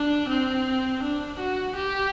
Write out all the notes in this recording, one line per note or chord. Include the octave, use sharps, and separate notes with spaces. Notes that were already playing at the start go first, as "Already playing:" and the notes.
Already playing: D4
C4
D4
F#4
G4